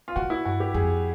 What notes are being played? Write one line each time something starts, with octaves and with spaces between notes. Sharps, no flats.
F4
B2 F#4
E4
G2 F#4
G4
F2 G#4